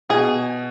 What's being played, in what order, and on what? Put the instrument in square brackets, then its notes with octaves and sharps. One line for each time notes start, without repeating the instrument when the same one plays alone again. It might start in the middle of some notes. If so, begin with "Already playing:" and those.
[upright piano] B2 [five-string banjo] G#4